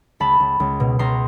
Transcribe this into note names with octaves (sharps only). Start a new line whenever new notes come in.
C#2 A5 B5
C#2
C#2
B2
C#2 A#5 C6